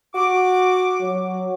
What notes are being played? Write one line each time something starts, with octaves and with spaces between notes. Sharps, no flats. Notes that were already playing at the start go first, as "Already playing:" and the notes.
F#4 D6
F#3